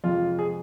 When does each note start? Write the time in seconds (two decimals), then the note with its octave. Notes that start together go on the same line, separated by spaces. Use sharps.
0.04 F2 C3 F3 G#3 F4
0.39 G#4